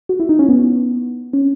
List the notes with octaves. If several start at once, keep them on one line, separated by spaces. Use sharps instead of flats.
F#4
E4
D#4
C#4
B3
C#4